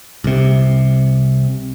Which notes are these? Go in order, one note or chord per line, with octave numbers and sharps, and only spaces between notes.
C2 C3